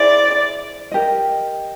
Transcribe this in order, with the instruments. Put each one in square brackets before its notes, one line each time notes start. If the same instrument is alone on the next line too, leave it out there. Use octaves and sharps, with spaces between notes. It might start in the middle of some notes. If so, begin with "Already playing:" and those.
Already playing: [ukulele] E4 G#4 C5 E5 [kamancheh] D5
[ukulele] G4 A#4 D#5